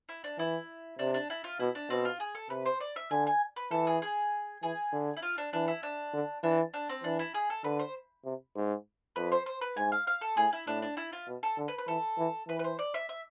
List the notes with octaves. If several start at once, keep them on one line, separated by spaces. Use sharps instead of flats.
E4
D4
E3 E4
C3 D4
D4
E4
F4
B2 E4
D4
B2 C4
F4
G#4
A4
C3 B4
C5
D5
E5
D3 G#5
G#5
B4
E3 A4
G#4
G#4
E3 G#4
D3
E4
F4
D4
E3 D4
E4
D4
D3
E3 D4
D4
C4
E3 D4
E4
G#4
A4
D3 B4
C5
C3
G#2
F2 B4
C5
C5
B4
G#2 G#5
F5
F5
A4
A2 G#4
E4
A2 D4
D4
E4
F4
B2
A4
D3
B4
B4
E3 A4
E3
E3 B4
B4
C5
D5
E5
E5